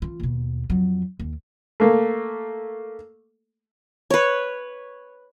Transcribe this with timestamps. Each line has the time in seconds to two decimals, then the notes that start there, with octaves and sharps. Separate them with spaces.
0.02 E3 F4
0.20 D#2 B2
0.70 F2 F#3
1.20 D#2
1.80 A3 A#3
4.10 B4 C#5